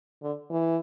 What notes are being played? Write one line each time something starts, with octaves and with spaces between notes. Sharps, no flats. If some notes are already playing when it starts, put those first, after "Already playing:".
D3
E3